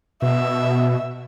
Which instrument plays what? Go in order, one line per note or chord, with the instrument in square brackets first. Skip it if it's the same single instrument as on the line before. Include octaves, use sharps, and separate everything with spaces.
[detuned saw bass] B2 [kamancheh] E5